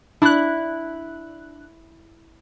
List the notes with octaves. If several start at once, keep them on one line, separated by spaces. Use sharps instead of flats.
D4 E4 F#6